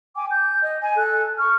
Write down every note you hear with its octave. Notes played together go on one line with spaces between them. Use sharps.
G5 G#5 D6
G6
D#5
G#5
A4 F#6
C#6 F6